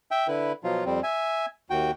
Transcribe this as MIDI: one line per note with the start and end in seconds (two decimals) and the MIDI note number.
0.11 0.27 76
0.11 0.27 79
0.28 0.52 50
0.28 0.52 64
0.28 0.52 71
0.64 0.84 47
0.64 0.84 53
0.64 0.84 54
0.64 0.84 65
0.86 1.00 41
0.86 1.00 55
0.86 1.00 60
1.03 1.46 76
1.03 1.46 80
1.70 1.91 39
1.70 1.91 66
1.70 1.91 79